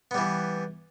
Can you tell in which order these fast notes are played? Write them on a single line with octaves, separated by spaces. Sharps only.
B3 G3 E3